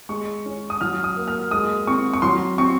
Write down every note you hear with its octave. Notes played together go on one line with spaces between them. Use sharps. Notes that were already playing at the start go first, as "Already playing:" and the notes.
G#3 C#6
C#4
D#6
F#3 F6
D#6
A#3
F6
G#3 D#6
C4 C#6
C#6
F#3 C6
C4 C#6